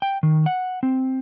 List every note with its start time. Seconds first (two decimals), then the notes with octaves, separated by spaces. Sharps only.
0.02 G5
0.23 D#3
0.46 F#5
0.83 C4